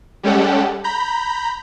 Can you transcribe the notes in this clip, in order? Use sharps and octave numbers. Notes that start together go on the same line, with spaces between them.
G3 G#3 C#4 G4 A4 F#5
A#5 B5 G6